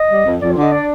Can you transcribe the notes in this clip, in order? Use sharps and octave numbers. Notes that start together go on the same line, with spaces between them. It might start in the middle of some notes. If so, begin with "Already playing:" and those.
Already playing: D#5
G3
F2
F2 D5
F4
D3
D#5
D4 D5